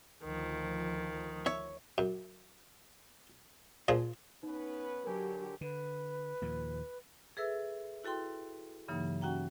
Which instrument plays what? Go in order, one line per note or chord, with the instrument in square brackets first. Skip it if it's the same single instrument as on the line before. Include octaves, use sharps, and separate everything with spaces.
[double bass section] D2 F3 [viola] D#3
[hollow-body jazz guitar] C#5 E5
[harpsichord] F#2
A#2 F3 G#4
[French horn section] B3 C#4 B4 [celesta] D#4
[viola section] D3 F#3 G4 [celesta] A#4 G#5
[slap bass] D3 [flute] B4
[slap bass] D#2 A#2 F3
[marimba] G#4 A4 B4 E5 E6
E4 F#4 A4 G5 C6
G2 C#3 E3 F#3 A#3 D#4
C#4 F#4 F#5 G5 A#5